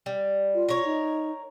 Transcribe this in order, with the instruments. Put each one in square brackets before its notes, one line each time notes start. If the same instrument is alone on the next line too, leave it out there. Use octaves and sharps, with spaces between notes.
[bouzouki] G3
[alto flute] F4
[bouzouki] A#4 C#5
[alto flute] D#4